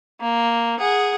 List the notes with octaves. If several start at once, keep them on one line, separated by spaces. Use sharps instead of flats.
A#3
G#4 F#5